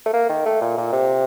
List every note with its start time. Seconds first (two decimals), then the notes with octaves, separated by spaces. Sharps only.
0.06 A3
0.13 A#3
0.29 D#3
0.46 A3
0.61 A#2
0.78 A#2
0.92 C3